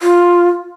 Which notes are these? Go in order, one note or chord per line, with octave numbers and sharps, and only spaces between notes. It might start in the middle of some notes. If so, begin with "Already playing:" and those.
F4